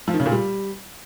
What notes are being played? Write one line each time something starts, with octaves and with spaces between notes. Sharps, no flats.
F3
D#3
C#3
A#2
G3